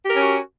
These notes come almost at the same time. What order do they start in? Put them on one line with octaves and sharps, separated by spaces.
G4 A#4 C#4 F#4